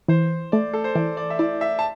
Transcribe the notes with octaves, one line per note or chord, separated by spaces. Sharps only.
E3 C5
A3 D5
A4
C5
E3 D5
D5
E5
E4 D5
E5
A5